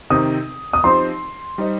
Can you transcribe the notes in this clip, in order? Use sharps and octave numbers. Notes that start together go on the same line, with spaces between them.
C3 D#3 C4 D#4 D#6
D#6
F3 C4 D#4 G4 C5 C6
G3 D#4 C5 D#5